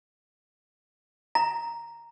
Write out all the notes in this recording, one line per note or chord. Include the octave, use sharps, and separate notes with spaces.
A#5